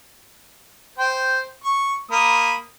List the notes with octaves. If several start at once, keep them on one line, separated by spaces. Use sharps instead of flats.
C5 G5
C#6
A#3 B5 D#6